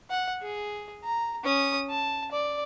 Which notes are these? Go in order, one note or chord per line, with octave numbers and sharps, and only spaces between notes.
F#5
G#4
A#5
C#4 D#6
A5
D5